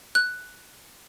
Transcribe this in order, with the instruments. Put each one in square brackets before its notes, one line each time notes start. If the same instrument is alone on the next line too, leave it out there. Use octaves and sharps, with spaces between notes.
[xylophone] F#6